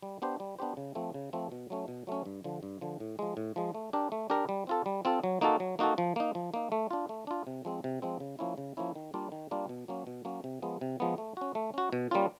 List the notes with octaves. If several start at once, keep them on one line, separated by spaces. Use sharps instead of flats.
G3
B3 D4 G4 C5
G3
B3 D4 G4 C5
C#3
F3 A3 C4
C#3
F3 A3 C4
B2
F#3 A3 C#4
B2
F#3 A3 C#4
G2
D3 F3
G2
D3 F3
A2
F3 G#3
A2
F3 G#3
A3
D4 G4 A#4
A3
D4 G4 A#4
G3
C4 F4 A4
G3
C4 F4 A4
F#3
A#3 D#4 F#4 A4
F#3
A#3 D#4 F#4 A4
F3
A#3 D#4
F3
A#3 D#4
A3
D4 F4
A3
D4 F4
C3
F3 G#3 C4
C3
F3 G#3 C4
C#3
F3 A#3 C#4 E4
C#3
F3 A#3 C#4 E4
D#3
G3 A#3 D4 F4
D#3
G3 A#3 D4 F4
B2
F#3 A#3 C#4
B2
F#3 A#3 C#4
C3
F3 G#3 B3
C3
F3 G#3 B3
A3
C#4 F#4
A3
C#4 F#4
B2
G3 A#3 C#4 F4